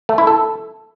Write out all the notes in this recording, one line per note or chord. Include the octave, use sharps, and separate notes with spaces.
A3
E4
A4